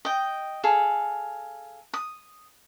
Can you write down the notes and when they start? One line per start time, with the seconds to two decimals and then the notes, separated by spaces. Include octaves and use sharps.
0.05 D#5 G5
0.63 G#4 A4 F5
1.94 D#6